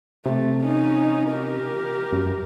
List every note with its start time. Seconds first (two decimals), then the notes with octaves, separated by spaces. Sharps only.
0.26 C3 A3
0.65 C#4 D#4
1.30 G4 A#4
2.12 F#2